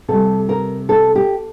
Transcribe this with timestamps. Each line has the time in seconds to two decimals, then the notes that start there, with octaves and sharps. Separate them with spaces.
0.08 C3 G3 A4
0.49 A#4
0.89 A4
1.15 G4